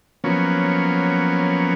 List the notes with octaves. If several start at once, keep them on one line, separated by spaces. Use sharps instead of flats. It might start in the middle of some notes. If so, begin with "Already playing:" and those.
F3 F#3 A#3 B3 C#4